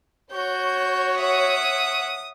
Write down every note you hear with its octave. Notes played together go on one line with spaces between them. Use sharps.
F#4 C#5 G6
E5 F#5 D#6